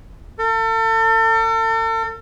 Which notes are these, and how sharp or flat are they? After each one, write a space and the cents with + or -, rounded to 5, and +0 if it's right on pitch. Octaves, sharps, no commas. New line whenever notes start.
A4 +40